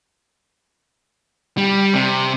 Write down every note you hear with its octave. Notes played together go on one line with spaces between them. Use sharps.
G3
C3